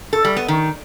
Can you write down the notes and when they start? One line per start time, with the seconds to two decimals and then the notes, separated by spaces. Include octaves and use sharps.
0.13 A4
0.25 G3
0.36 B3
0.48 D#3